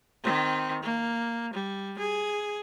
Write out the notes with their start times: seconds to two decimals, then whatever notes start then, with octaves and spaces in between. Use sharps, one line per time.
0.23 D#3 C4
0.83 A#3
1.54 G3
1.99 G#4